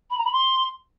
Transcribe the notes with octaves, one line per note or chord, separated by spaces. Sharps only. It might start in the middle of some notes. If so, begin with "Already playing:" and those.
B5
A#5
B5
C6